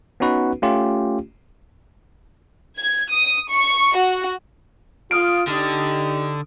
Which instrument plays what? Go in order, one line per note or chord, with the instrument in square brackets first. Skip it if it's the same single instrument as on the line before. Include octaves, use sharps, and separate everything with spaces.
[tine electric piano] B3 C#4 D#4 F#4 B4
A3 C#4 F4 G4
[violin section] G#6
D#6
C#6
F#4
[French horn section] F4 [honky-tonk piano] D#6 F6 D7
[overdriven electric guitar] D3 [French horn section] D4 D#4 G4